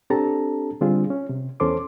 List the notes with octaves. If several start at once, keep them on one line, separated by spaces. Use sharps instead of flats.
C4 D4 G4 A4 A5 A#5
D3 G3 C4 D4 F4 G#4
C#4
C3
E2 C#4 A4 C5 C6 D6